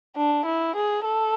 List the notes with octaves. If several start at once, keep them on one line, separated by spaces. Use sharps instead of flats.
D4
E4
G#4
A4